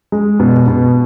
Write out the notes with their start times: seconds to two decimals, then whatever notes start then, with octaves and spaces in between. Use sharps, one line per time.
0.12 G#3
0.40 B2
0.68 B2